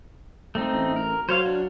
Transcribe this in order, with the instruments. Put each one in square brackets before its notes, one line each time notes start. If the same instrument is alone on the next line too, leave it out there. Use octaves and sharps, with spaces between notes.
[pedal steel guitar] A3 C4 D#4
[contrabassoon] A1
[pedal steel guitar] A#4
[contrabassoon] F#3 [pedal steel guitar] C5 C#5 F5
[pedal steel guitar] D4